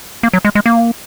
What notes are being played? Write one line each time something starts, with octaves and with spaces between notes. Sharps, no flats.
A#3
F#3
G#3
G#3
A#3